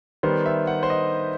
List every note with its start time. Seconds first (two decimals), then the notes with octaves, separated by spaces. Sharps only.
0.23 D#3 G3 B3 C5
0.46 E5
0.67 F#5
0.83 C5
0.90 D#5